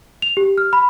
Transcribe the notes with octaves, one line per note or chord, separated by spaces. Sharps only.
F7
G4
F6
B5